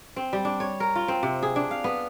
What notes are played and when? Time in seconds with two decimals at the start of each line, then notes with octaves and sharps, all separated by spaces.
0.16 C4
0.33 G3
0.45 D4
0.60 C#5
0.80 A#4
0.96 F4
1.08 C4
1.23 C3
1.43 G#4
1.56 D4
1.71 F5
1.84 B3